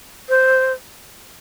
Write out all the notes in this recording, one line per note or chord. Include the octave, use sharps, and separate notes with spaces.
C5